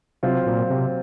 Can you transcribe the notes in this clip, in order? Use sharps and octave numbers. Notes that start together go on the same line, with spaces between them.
C3 F#3 C4 F4
A#2
C3